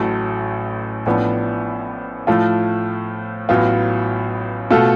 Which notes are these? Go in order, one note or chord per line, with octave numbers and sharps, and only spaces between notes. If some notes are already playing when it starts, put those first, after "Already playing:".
Already playing: A1 A2 F#3 A3
A1 A2 F3 B3 D4
A2 F3 A3 F4
A1 A2 F#3 B3 F4
B2 A3 F4 A4